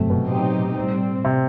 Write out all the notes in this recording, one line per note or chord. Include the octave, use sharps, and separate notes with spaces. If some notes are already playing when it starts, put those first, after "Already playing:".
Already playing: G1 F#2 C3 A3
B2
A2 F#3 C4 D#4 G4
A2 G3 C4
C3